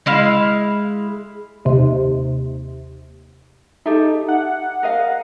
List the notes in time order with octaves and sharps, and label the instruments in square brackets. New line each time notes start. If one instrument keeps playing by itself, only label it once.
[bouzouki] G#3 E4 F5
[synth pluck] D#2 C3
[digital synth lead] D#4 [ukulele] G4 A4 E5
[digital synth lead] F#5
[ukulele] A#4 D#5 F5